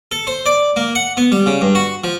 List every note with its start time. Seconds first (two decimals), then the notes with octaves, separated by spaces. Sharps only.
0.11 A4
0.27 C5
0.46 D5
0.76 A#3
0.95 F#5
1.17 B3
1.32 G3
1.46 C#3
1.61 G2
1.75 F#4
2.04 F3